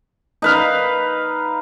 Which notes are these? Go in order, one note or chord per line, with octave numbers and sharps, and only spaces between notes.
D#4 B4 F5